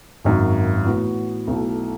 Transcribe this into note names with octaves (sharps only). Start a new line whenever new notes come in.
G#1 F#2 D#3
A2 E3 B3 F#4
B1 B2 A3 E4